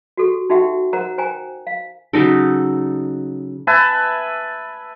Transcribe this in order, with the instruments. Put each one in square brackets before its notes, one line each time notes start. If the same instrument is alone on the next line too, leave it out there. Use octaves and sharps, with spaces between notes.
[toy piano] F#4 G4 A4
D#4 F#4 G4 E5 F#5 G5
A#4 C5 F#5 A#5
C5 G5 G#5 A#5
F5
[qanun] C#3 F#3 D#4 A4
[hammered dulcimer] B4 E5 G#5 A5